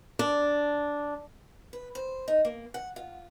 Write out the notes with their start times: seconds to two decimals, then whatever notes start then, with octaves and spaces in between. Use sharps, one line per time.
0.19 D4
1.73 B4
1.95 C5
2.28 D#4
2.45 A#3
2.74 F#5
2.96 F4